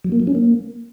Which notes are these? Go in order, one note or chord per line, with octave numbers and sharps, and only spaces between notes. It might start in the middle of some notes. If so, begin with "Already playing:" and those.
F#3
A#3
F#3
C#4
A#3